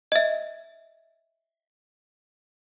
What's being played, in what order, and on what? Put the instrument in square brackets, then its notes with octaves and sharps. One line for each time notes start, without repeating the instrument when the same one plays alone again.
[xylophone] D#5 E5